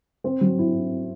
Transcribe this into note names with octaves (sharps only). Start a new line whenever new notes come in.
C4
F#3
E4